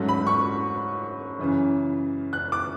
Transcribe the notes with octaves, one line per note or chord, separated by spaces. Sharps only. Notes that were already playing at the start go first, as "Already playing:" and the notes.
Already playing: G#2 F#3 A3 C#4
B5
C#6
F#2 C#3 E3
F#6
D6